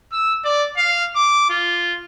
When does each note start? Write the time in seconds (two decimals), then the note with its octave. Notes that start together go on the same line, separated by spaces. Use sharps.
0.12 E6
0.45 D5
0.77 F5
1.16 D6
1.50 F4